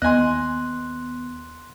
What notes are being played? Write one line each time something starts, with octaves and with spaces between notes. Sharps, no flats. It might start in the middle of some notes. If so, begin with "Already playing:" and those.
D#2 B3 D#5 G#5 C6 F#6